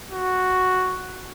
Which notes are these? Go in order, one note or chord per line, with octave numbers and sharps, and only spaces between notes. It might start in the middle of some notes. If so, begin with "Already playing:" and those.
F#4